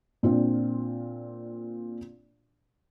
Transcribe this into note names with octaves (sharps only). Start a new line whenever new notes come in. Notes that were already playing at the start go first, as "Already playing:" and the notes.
A#2 C4 D4 F4